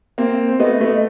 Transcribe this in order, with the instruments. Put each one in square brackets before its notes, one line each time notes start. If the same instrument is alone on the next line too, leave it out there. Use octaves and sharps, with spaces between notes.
[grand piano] A#3 C4
C4
[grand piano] A3 B3 [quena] D#5
[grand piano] A3 B3